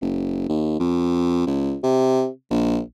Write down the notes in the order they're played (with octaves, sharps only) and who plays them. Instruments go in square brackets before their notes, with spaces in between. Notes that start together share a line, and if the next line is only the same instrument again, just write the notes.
[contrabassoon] F#1
D#2
F2
C#2
C3
A#1